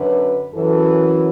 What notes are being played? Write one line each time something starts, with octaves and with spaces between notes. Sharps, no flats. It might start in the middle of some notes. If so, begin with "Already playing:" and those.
Already playing: F#2 D3 B4
F#2 E3 A4